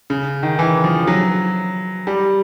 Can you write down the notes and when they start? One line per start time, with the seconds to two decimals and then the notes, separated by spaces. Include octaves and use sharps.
0.10 C#3
0.43 D#3
0.59 E3
0.84 F3
1.07 F#3
2.07 G3